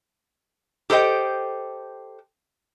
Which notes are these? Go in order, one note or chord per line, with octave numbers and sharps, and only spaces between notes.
G4 A4 C5 D#5 G5